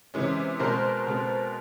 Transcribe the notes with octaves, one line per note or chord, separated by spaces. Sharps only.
C3 E3 G#3 C#4
B2 G#3 C4 A#4 C5
B2 G#3 C4